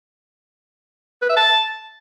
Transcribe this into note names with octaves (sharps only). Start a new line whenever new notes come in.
B4
E5
A5